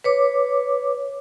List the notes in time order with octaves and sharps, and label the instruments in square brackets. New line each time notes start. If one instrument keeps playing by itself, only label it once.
[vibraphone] B4 C#5 D6